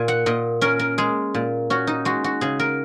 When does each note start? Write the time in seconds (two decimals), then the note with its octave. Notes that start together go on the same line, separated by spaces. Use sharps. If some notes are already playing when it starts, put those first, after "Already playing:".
Already playing: A#2 G#5
0.08 F#5
0.26 A#2 D#5
0.61 C#4 A#4
0.79 A#4
0.98 G#3 G#4
1.34 A#2
1.70 C#4 F#4
1.87 D#4
2.05 G#3 F#4
2.24 F#4
2.41 C#3 G#4
2.60 A#4